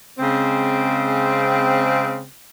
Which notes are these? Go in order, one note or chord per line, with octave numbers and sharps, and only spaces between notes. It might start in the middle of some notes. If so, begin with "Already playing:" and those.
C#3 G#3 C4